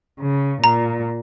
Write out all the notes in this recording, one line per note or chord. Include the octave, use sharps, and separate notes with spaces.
C#3
A#2 A#5